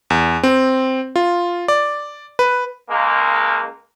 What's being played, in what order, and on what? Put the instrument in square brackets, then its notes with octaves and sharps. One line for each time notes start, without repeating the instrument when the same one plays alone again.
[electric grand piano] E2
C4
F4
D5
B4
[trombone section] C#2 G#3 A#3